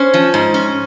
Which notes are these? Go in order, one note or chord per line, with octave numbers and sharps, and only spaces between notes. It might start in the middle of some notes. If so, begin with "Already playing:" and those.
Already playing: C#4 C5
F3
G#2
C#4